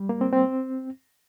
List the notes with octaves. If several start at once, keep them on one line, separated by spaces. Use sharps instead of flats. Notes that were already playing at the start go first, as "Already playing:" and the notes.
Already playing: G3
A#3
C4
C4